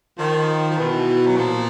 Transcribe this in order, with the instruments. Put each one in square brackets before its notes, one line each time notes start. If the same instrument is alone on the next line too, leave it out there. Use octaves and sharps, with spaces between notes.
[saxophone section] D#3 [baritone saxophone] F3
[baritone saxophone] F3
[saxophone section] B2 [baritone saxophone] E3
[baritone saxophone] F#3
[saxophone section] A#2 [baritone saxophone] F3